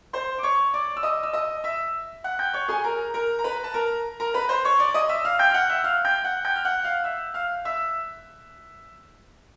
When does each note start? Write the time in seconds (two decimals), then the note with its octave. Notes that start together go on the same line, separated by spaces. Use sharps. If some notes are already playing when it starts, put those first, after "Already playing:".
0.13 C5 C6
0.38 D6
0.43 C#5 C#6
0.74 D5 D6
0.97 E6
1.03 D#5 D#6
1.23 E6
1.33 D#5 D#6
1.64 E5 E6
2.24 F#5 F#6
2.39 G5 G6
2.53 C#5 C#6
2.68 G#4 G#5
2.84 A#4 A#5
3.14 A#4 A#5
3.39 A#5
3.44 B4 B5
3.64 A5
3.74 A#4 A#5
4.20 A#4 A#5
4.34 B4 B5
4.49 C5 C6
4.64 C#5 C#6
4.79 D5 D6
4.89 D6
4.94 D#5 D#6
5.09 E5 E6
5.25 F5 F6
5.39 G5 G6
5.50 F6
5.54 F#5 F#6
5.70 E5 E6
5.84 F5 F6
6.05 G5 G6
6.24 F#5 F#6
6.45 G5 G6
6.56 F6
6.65 F#5 F#6
6.84 F5 F6
7.04 E5 E6
7.34 F5 F6
7.65 E5 E6